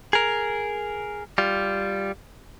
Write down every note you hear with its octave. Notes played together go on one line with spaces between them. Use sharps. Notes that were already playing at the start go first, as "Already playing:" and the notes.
G#4 A#4
G3 F4